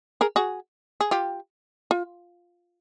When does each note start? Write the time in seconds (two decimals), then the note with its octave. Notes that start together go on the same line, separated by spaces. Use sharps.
0.21 G#4 A#4
0.36 F#4 G#4
1.01 G#4
1.11 F4 G4
1.91 F4